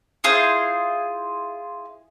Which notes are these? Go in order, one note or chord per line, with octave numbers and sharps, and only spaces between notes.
E4 F4 G#4 C5